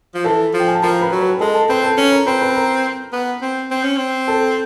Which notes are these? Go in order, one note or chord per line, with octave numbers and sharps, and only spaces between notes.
F3
E3 A4 A5
F3
G5
G#5
A5
F3 A#4 A#5
B4 B5
F#3
B4 B5
G#3 A4 A5
A4 A5
C4 B4 B5
A4 A5
C#4
A#4 A#5
C4 B4 B5
B4 B5
A#4 A#5
B3
C4
C4
C#4
C4
A4 A5